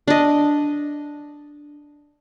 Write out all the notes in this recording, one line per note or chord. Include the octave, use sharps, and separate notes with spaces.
D4 D#5